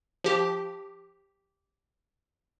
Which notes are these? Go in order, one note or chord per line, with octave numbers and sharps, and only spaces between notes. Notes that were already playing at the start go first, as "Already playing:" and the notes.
F3 G4